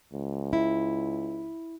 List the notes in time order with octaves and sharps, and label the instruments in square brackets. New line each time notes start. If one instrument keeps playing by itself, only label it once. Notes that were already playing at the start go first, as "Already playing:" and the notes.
[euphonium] C#2
[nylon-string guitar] E4